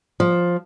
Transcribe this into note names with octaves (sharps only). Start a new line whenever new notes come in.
F3